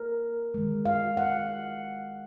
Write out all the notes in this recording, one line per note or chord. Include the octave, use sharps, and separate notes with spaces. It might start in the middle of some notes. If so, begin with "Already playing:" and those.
Already playing: A#4
D#3 G#3
F5
F#5